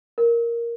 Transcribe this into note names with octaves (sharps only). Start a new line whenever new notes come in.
A#4